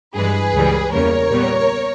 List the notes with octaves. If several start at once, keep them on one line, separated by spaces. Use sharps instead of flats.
G2 E3 G#3 G#4 B4
C#2 C#3 E3 G3
E2 C#3 G3 A#3 A#4 C#5
A#2 G3 B3